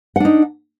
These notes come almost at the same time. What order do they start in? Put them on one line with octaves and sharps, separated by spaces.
F#5 D4 D#4